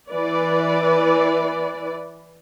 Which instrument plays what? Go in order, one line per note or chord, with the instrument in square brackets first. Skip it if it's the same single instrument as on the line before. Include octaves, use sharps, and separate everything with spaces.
[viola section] E3 B4 D5